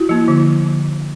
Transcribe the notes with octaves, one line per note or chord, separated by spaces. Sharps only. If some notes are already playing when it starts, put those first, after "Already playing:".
Already playing: E4 F#4
F3 A#3
D3